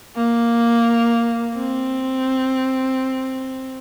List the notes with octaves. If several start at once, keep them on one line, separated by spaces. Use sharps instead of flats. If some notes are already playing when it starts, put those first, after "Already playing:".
A#3
C4